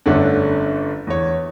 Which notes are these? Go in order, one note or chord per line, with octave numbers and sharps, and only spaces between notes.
G1 D3 A3 C#4 D4
E2 C#5